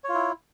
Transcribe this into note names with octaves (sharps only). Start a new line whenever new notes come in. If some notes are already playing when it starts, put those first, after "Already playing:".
E4 F4 C#5